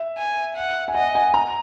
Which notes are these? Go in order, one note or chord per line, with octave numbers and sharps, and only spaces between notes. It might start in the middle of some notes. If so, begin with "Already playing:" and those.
Already playing: E5
G#5
F#5
G#5
D#5 F#5
G#5
A#5